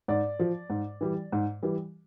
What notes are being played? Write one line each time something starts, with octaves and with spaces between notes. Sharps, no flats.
G#2 D5
F3
G#2
E3 G3
G#2
E3 G3